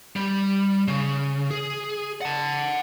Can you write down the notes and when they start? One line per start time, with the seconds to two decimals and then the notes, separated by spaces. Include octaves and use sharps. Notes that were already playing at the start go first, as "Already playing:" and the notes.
0.16 G3
0.88 C#3
1.51 G#4
2.21 F#5 A5